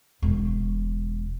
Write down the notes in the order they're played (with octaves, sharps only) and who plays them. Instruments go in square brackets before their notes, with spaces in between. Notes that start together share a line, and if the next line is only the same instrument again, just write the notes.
[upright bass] E1